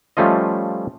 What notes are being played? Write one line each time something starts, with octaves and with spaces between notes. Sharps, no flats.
F3 G3 A3 C#4 F4 D#5